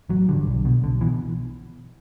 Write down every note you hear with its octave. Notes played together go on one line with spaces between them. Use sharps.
A1 F#3
G2 D3
B1
B2
B1 D3
B2 E3